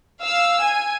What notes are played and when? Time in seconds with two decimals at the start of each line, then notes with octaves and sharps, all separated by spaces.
0.21 F5 E6
0.63 G#5